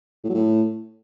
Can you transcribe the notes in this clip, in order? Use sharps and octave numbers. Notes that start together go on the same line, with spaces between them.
A2
F#3
A2